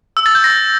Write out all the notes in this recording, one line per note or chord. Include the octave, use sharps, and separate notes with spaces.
E6
A6
G6
A#6